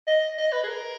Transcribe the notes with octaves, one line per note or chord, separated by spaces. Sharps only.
D#5
D#5
B4
G#4
A#4